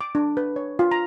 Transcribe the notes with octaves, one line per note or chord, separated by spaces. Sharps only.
D6
D4
B4
C#5
F4
A#5